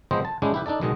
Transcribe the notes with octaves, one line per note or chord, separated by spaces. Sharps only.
F3 G#3 B3 C4 C5 D#5
A5
G#3 C#4 D4 E4 G4
E4 G4 B4
D4 D#4 A4 D5
B1 B2 D#3 G#3 D#5